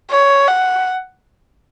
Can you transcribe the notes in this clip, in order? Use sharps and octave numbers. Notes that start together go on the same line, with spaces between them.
C#5
F#5